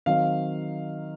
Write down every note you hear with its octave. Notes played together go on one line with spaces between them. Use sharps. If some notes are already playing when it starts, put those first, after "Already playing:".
D#3 F#3 C4 D#4 F5